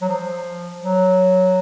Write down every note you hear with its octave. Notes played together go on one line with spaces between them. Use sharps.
F#3
F3
F#3